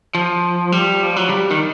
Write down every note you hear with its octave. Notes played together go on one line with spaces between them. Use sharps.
F3
G3
F3
F#3
G3
D#3